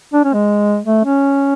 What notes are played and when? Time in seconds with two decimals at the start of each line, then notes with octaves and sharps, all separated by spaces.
0.14 D4
0.24 C#4
0.34 G#3
0.84 A3
1.05 C#4